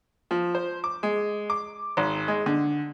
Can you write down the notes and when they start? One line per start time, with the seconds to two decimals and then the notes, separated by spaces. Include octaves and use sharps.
0.31 F3
0.55 C5
0.84 D6
1.03 G#3
1.50 D6
1.97 G#1
2.28 G#3
2.46 D3